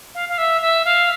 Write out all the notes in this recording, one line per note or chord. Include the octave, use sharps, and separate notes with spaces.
F5
F5
E5
E5
F5